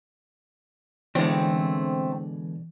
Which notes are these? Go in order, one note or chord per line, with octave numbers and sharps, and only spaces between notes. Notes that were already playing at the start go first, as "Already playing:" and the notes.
B2 D3 E3 G#3 A3 C4